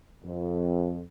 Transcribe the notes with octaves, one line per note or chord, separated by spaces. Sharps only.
F2